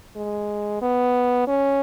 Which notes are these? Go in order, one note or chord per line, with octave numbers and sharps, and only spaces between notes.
G#3
B3
C#4